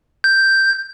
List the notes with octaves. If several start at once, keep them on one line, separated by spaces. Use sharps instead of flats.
G6